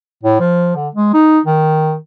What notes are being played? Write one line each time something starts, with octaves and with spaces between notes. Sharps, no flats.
A2
F3
D3
G#3
D#4
D#3